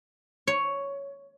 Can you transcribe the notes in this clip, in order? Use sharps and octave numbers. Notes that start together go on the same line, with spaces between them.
C#5